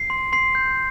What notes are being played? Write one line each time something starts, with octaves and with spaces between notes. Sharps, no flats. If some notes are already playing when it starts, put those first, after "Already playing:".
Already playing: C7
C6
C6 C7
G6